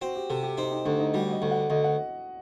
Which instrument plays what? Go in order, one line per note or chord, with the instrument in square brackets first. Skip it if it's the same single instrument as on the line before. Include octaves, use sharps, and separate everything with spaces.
[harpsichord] C4 [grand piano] F#4
[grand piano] G4
[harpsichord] C3 [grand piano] A4
[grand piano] G4
[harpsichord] C4 [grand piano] D#4
[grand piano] D#4
[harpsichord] D2 [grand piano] D4
[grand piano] D#4
[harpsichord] G3 [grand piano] F#4
[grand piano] D#5
[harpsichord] D2
[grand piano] F#5
[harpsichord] D2 [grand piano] D#5
[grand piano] F#5